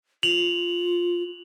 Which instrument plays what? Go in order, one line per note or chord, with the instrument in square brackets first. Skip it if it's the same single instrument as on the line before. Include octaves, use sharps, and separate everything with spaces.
[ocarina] F4 [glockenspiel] F7 F#7